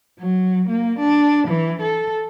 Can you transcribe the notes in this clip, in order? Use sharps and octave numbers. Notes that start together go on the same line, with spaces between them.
F#3
A#3
D4
E3
A4